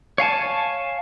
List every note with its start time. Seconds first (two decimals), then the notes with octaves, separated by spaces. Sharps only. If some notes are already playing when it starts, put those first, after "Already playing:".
0.18 C#5 F5 G#5 A5